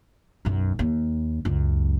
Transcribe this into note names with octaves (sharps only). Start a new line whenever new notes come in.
B1 F#2
D#2
C#2 F#2